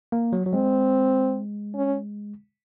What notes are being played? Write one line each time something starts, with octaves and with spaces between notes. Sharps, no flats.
A#3
F#3
F#3
G#3 C4
C#4